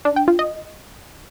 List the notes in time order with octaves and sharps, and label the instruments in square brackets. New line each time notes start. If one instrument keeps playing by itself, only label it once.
[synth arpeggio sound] D4
G5
F4
D#5